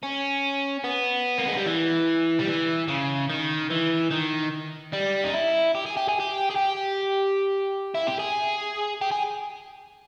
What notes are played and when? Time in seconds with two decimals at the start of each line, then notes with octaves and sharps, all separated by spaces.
0.03 C#4
0.84 B3
1.39 A#3
1.48 G#3
1.57 G3
1.66 E3
2.39 G3
2.47 E3
2.88 C#3
3.30 D#3
3.70 E3
4.11 D#3
4.93 G3
5.24 D#4
5.34 E4
5.75 G4
5.86 G#4
5.97 G4
6.09 G#4
6.20 G4
6.51 G#4
6.56 G4
7.95 E4
8.07 G4
8.19 G#4
9.01 G4
9.12 G#4